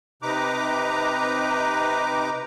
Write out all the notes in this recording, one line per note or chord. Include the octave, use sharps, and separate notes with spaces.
C3 D#4 B4 A#5 D6